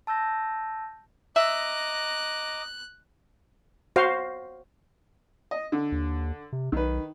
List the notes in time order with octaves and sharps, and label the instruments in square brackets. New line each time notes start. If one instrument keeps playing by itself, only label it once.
[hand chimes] A5 E6 G6 A#6
[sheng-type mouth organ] D#5 A#5 D6 [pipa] E5 [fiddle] F#6
[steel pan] F#4 C5 F5
[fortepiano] D#5
D3
[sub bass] D#2
C3
[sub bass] B1 [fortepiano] D#3 B4